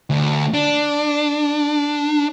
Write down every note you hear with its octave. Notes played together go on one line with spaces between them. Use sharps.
D2
D4